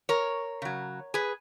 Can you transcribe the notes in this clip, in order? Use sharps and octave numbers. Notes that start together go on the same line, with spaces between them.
A#4 C#5
C#3 F#3
G#4 B4